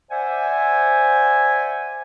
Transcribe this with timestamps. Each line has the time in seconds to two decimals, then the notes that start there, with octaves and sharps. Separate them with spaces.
0.10 C5 D5 E5 F#5 G#5